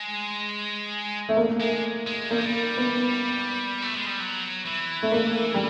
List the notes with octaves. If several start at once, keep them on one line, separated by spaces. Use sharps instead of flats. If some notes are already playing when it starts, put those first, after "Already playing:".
Already playing: G#3
A3
A#3
G#3
G#3
G3 A#3
G#3
G3
B3
A3
G#3
G3
F#3
E3
A3
A#3
G3